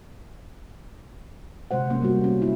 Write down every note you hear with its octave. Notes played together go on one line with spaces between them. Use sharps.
C3 G#3 C5 F#5
A#3 C#4
G3 B3 F#4
C#4
E4